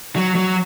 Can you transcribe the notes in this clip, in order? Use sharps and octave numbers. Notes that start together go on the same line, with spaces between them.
F#3
F#3